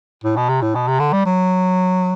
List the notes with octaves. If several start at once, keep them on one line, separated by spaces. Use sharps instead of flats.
A2
B2
C3
A2
B2
C3
D3
G3
F#3